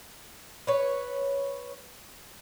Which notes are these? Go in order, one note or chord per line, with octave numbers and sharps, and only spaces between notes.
B4 C#5